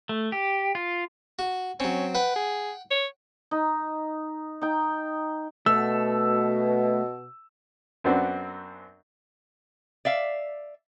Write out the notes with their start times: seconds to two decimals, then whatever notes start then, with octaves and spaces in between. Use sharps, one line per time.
0.09 A3
0.32 G4
0.75 F4
1.39 F#4
1.80 F#3 C4 C#4
2.15 B4 F#5 G5
2.36 G#4
2.91 C#5
3.51 D#4
4.62 D#4 G5
5.66 B2 A3 E6
8.04 F#2 B3 C4 D4 F#4
10.05 D5 E5 F5